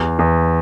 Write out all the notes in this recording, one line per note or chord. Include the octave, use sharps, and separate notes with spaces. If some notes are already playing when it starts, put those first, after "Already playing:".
Already playing: E2
E2